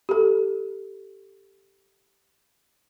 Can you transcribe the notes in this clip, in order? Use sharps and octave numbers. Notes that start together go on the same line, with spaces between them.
G4 A4